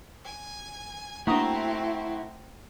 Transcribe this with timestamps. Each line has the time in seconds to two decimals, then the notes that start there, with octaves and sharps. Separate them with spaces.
0.24 G#5
1.27 A3 A#3 C4 D4 E4 F#4 A#5 D#6